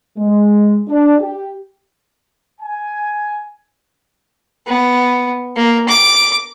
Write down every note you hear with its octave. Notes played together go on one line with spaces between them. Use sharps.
G#3
D4
G4
G#5
B3
A#3
D6